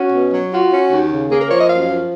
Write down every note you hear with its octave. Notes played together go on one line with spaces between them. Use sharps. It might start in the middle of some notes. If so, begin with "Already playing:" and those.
Already playing: C#4 F#4
B2
F#3
F4 F#4
C#4
D#2
C#3
A#3 G#4
A#4
F3 C#5
D#5
F#2 F5
F3